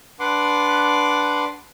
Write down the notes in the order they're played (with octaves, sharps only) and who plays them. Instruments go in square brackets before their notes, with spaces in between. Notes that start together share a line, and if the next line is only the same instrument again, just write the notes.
[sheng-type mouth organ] D4 B4 F#5 C6 D6